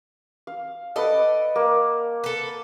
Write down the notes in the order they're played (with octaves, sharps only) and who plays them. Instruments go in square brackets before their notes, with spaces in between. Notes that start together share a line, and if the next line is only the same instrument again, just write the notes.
[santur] F5
[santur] A4 B4 F#5 [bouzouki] D5 D#5
[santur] A#3
[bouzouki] A4 B4